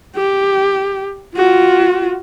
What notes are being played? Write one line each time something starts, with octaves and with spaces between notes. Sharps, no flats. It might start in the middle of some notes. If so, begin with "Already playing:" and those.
G4
F4 F#4